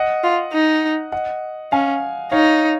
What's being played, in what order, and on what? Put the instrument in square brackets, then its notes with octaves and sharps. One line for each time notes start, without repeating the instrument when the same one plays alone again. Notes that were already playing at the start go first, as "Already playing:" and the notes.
Already playing: [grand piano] D#5 F#5
[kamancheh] F4
D#4
[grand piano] D#5 F#5
[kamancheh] C#4 [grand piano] F5 G#5
[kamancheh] D#4 [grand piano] C#5 F5